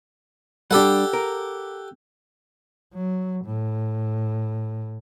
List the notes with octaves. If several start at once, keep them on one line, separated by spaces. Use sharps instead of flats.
G3 D4 G4 A4 F#5
A#4
F#3
A2